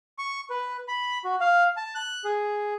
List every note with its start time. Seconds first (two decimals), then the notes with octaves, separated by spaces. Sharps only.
0.18 C#6
0.50 B4
0.88 B5
1.25 F#4
1.41 F5
1.77 A5
1.95 F#6
2.24 G#4